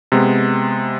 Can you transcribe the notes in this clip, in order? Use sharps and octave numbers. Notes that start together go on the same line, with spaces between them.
C3 G#3 B3